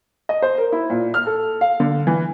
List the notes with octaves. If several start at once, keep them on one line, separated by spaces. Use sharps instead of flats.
D#5
C5
A#4
E4
A#2
F6
A4
F5
D3
E3